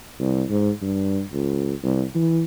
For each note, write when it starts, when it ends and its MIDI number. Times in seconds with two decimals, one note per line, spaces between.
0.20 0.43 36
0.50 0.70 44
0.82 1.21 43
1.33 1.73 37
1.83 2.03 36
2.15 2.44 52